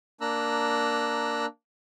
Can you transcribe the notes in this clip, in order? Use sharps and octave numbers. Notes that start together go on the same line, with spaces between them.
A#3 D4 A#5 E6 F#6